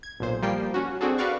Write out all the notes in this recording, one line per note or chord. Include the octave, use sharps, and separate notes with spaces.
G#6
B1 A#2 C5
F3 G3 A#3 G5 C7
C#4 F#4
C4 D4 F#4 G#4 A4
F#4 B4 D5 F5 C#6